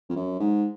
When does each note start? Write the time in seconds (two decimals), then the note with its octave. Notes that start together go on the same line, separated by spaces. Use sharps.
0.09 F2
0.16 F#2
0.40 G#2